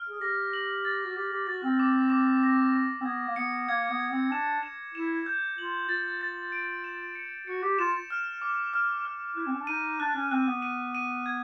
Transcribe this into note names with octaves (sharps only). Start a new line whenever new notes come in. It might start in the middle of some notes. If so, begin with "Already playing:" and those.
Already playing: F6
G#4
G4 A#6
F#7
A6
F#4
G4 A6
G4
F#4 A6
C4
D6
D6
A#6
D6
C4
B3 G#6
A#3
B3 C#7
A#3 G#6
B3
G#6
C4
D4 E7
E7
E4 E7
G6
F4 F#7
F4 A6
A6
D7
E7
C#7
F#4 C#7
G4
F4 E7
F6
D6
F6
F6
E4 F#6
C4
C#4
D4
D#4 D#7
D4 F#6
C#4
C4 F#6
B3
D#7
D#7
G#6